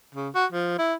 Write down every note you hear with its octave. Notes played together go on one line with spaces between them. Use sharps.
C#3
F#4
F3
E4